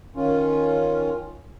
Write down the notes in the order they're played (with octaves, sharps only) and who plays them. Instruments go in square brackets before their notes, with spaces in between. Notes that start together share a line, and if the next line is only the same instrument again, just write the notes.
[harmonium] D#3 C#4 F4